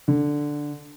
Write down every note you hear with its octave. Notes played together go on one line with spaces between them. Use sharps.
D3